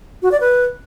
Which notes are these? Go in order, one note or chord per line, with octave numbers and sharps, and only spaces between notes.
F#4
D5
B4